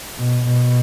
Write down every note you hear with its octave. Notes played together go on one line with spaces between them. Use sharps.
B2
B2